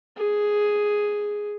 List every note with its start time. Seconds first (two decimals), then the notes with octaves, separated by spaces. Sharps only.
0.17 G#4